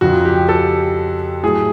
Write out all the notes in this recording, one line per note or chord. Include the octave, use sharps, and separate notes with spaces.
F2 C#3 F3 F#4
G4
A4
A2 F#3 A3 G#4